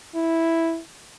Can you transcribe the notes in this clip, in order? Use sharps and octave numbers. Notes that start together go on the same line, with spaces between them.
E4